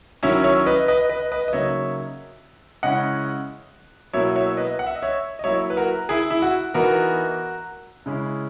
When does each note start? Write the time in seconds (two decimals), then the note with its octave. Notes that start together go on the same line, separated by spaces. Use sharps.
0.23 D#3 F#3 C#4 E4 C#5 E5
0.44 C#5 E5
0.66 B4 D#5
0.88 B4 D#5
1.09 B4 D#5
1.32 B4 D#5
1.48 D#5
1.53 C#3 F#3 A#3 D#4 C#5 E5
2.83 C#3 G#3 C#4 E4 D#5 F#5
4.13 B2 F#3 A#3 E4 C#5 E5
4.36 C#5 E5
4.57 B4 D#5
4.79 F#5
4.86 E5
4.95 D#5
5.02 C#5 E5
5.39 D#5
5.44 F#3 A#3 E4 C#5 E5
5.70 B4
5.77 F#4 A#4
6.09 E4 G#4
6.30 E4
6.42 F#4
6.74 E3 B3 D#4 F#4 A#4
8.06 C#3 G#3 C#4 E4